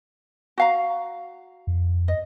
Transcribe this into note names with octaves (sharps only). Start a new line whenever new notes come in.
F#4 F5 A#5
F2
D#5